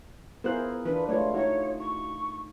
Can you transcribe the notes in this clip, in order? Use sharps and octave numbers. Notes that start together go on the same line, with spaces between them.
B3 E4 F4 G#4 A#4 C5 F#6
E3 D4 F4 B4
G#3 A3 F4 B4 C#5 D5
D#4 E4 F#4 C#5
C#6